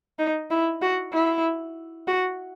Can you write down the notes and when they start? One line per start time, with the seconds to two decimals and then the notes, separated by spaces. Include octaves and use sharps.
0.19 D#4
0.50 E4
0.82 F#4
1.13 E4
2.07 F#4